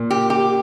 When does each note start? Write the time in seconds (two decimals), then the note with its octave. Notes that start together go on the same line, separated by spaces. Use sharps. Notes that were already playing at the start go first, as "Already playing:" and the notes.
Already playing: A#2
0.10 G4
0.30 G4